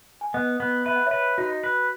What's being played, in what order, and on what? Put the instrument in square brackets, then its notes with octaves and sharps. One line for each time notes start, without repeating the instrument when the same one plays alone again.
[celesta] G#5
[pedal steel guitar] B3 [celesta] D#5 F#5
[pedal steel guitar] B3
[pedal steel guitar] B4 [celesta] E5
[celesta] F#5
[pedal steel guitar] B4 [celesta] C#5 E5
[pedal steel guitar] D#4 [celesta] F#4
[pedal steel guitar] B4